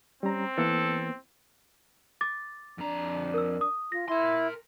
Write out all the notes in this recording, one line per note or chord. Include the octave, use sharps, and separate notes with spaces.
G3 C4 C#4 A#5
E3 A#3 B3 A4
D6 A6
F2 D4 A#5
A#4 E6
D#6
F4 A#6
E4 A#4 C6